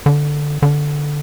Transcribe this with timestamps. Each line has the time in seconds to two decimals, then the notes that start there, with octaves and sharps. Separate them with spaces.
0.06 D3
0.62 D3